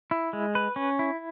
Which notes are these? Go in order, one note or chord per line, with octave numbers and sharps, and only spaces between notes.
E4
G#3
B4
C#4
E4